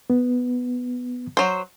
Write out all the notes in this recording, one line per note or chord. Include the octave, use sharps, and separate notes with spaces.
B3
F#3 C5